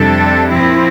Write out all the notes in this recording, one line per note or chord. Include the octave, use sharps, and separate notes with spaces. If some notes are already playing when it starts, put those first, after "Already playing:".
Already playing: F2 C3 G3 D4 A4
A#2 F3 C4 E4